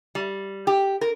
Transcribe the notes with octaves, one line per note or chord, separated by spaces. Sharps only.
G3
G4
A#4